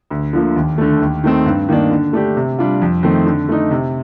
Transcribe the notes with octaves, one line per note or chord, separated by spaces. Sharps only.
D2
D3 F3 A#3
D#2
D3 A3
D#2
D#3 A3 C4
G2
D#3 A#3 D4
D3
A3 D4 G4
C3
G3 D4 F4
F2
D#3 A3 C4
D3
A3 D#4
C3